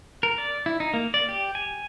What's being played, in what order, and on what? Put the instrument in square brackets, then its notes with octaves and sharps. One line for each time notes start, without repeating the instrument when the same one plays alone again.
[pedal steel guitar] A#4
D5
E4
D#4
A#3
D5
G4
G#5